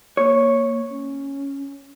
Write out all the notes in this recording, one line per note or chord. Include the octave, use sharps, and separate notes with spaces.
A#3 C#5
C#4